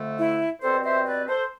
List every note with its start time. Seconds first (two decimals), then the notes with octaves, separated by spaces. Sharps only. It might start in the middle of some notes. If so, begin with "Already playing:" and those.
Already playing: F2 D3 A3
0.18 E4
0.62 B2 G3 C4 A4 C5
0.84 C5 E5
1.06 B4 D5
1.28 A4 C5